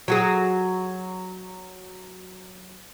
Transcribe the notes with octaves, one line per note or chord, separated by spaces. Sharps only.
F#3 F#4 G#4